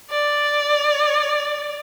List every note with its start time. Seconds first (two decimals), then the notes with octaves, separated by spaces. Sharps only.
0.11 D5